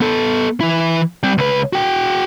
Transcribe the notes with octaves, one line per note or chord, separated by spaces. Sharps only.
B3 A4
E3 E4
G3 C4
C#2 B4
F#4 G5